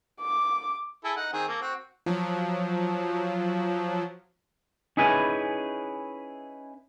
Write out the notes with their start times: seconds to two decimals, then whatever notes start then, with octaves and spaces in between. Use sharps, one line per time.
0.21 D6
1.04 E4 G#4 A4
1.17 D#4 F#5
1.33 D#3 C4 G#4
1.48 A#3 A4
1.61 C4 F#4
2.06 F3 F#3
4.97 C#4 D#4 E4 G#4 B4 G#5